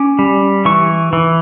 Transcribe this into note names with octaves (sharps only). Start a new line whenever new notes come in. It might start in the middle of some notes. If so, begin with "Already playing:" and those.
Already playing: C#4 D6
G3
E3 C#6
E3